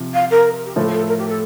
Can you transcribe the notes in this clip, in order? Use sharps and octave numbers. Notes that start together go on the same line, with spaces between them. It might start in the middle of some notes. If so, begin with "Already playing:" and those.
Already playing: C3 F3
F5
A#4
G4
A2 F3 A3 A4
A4
A#4
G4
A4